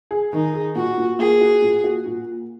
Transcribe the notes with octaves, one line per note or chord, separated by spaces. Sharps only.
G#4
D#3 D#4
G#4
A#2 F#4
A#2
A#3 G#4
F#4
A#2
F#4
A#2